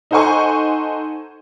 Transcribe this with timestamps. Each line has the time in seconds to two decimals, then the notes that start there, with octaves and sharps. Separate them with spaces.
0.11 D#4 A4 C5 F#5 G#5 C#6